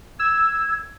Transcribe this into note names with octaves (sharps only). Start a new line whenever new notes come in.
E6 G#6